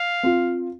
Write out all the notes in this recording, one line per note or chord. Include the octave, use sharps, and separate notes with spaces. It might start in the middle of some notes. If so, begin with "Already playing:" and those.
Already playing: F5
C4 F4